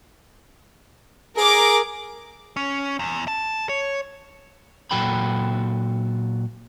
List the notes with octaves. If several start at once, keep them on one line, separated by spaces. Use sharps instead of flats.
G#4 A#4 D6
C#4
E2
A5
C#5
A#2 F#3 F#4 A4 G5 B5